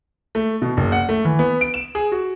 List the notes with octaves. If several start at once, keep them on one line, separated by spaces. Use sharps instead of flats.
A3
B2
F#1
F#5
A3
E3
B3
D7
E7
G#4
F#4